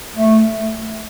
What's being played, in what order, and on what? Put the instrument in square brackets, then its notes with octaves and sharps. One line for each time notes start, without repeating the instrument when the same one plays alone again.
[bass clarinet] A3